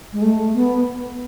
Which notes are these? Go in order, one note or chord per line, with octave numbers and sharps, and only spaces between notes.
G#3
A3
B3